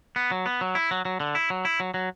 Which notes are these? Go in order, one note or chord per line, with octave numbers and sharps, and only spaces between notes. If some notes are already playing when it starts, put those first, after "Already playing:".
B3
F#3
B3
F#3
E4
F#3
F#3
D3
E4
F#3
E4
F#3
F#3